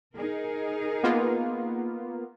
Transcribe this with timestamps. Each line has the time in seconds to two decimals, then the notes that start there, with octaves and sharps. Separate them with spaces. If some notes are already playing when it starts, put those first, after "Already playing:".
0.15 D#4 G#4 A#4
1.03 A#3 B3 F4